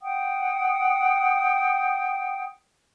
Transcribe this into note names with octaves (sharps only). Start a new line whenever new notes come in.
F#5 G5 D#6